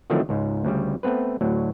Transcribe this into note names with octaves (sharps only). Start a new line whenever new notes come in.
D3 D#3 F3 F#3 A3 C4
C#2 G#2
D2 C#3 G3
A3 B3 C4 B4
D2 A2 F#3